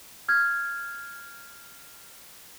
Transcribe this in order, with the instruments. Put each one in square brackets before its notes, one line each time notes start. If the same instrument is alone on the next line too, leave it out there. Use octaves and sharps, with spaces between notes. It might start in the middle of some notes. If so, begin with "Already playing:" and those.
[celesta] F6 G#6